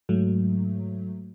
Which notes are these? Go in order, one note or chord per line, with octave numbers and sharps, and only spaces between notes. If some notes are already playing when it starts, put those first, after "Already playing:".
G#2 F#3 A3